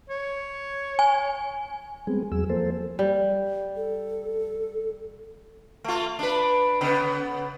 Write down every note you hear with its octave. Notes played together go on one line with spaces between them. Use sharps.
C#5
G#5
G3 G#3 B3 C4 G#4
E2 F#3 G#4 E6
F3 A#3 A4 C5
G3
A4
A3 F4
D4 B4
C#3 B3